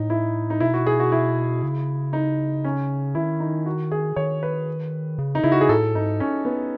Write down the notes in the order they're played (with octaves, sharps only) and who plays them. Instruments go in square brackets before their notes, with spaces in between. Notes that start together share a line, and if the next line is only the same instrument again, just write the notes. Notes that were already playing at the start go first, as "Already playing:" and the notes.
Already playing: [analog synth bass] A2 [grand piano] D#4
[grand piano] E4
D#4
[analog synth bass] B2 [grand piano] E4
[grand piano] F#4
G#4
F#4
E4
[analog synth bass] C#3
[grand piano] D#4
C#4
[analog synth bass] D#3 [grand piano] E4
[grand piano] D#4
F#4
G#4
[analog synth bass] D#3 [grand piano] C#5
[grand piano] B4
[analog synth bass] C#3
[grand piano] D#4
[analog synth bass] C#3 [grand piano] E4
[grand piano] F#4
G#4
[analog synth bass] A2 [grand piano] A4
[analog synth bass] G#2 [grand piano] D#4
[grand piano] C#4
B3